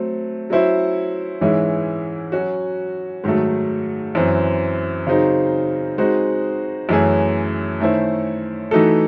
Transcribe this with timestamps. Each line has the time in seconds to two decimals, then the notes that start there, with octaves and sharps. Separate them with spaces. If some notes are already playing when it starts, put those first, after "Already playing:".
Already playing: F#3 A3 C4
0.50 F#3 C#4 E4 C5
1.41 G#2 E3 G#3 C#4 E4
2.32 F#3 C#4 F#4
3.24 G#2 D#3 F#3 A3
4.15 F#2 E3 C4
5.07 C#3 F#3 C4 D#4
5.98 G#3 C4 D#4 F#4
6.89 F#2 E3 A3 C#4 G#4
7.80 D#3 A3 C#4 E4 C5
8.71 E3 A3 D#4 F#4 A4